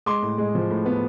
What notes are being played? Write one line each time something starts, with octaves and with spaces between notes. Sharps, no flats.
G#3 C6 D6
A2
G#3
F3
A2
B3